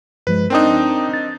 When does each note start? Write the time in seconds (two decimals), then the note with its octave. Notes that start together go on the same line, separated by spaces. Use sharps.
0.27 G2 F3 G#3 B4
0.50 C4 D4 D#4 A#4 G5 D#6
1.14 A6